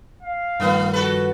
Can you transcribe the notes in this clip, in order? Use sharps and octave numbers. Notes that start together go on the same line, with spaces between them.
F5
G2 D#3 F3 A3 B3
F#4 A4 B4